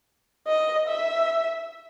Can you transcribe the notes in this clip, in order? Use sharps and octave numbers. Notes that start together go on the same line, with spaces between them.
D#5
E5